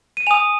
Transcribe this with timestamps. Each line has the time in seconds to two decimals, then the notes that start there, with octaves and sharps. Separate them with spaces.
0.17 D#7
0.27 G#5 D#6 F7